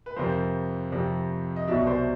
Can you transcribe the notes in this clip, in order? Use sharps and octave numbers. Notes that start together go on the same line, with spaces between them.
B4
F2 C3 F3 A#4 C5
F2 C3 F3
D#5
C2 B2 F#3 D5 E5
C5 D5